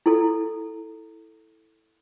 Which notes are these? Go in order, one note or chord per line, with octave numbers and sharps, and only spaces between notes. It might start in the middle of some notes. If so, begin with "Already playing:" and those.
E4 A4